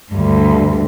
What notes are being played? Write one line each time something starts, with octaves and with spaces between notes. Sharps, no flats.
D2 G2